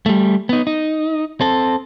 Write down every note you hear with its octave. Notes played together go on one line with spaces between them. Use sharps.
G3 A3
B3 D#4
D#4
C4 A4